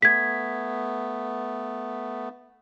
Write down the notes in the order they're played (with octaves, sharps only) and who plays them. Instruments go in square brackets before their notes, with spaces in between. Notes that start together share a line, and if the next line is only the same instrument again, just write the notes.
[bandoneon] A3 B3 [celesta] G#6 B6